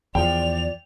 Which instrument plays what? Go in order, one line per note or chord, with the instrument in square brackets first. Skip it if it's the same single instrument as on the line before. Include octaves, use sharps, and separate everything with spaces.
[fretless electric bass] E2 F3 [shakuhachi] D5 [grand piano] G5 [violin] F7